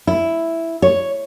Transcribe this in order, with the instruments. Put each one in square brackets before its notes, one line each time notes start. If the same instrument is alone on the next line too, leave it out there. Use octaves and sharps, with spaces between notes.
[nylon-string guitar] E4
C#5